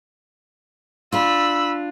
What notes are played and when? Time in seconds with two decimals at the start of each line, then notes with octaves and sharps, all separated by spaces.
1.12 D4 F4 B5 E6